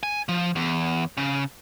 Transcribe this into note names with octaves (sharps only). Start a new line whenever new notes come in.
G#5
F3
E2
C#3